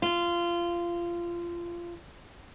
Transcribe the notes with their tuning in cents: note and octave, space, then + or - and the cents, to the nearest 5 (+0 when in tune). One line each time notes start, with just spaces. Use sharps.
F4 -20